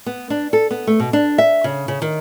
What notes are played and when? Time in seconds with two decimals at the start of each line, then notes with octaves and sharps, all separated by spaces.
0.06 B3
0.30 D4
0.53 A4
0.71 B3
0.87 A3
1.00 B2
1.13 D4
1.38 E5
1.64 C#3
1.88 C#3
2.02 D#3